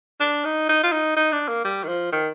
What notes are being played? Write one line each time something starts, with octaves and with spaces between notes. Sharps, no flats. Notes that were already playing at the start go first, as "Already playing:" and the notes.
D4
D#4
D#4
F4
D#4
D#4
D4
A#3
G3
D#3
F3
D#3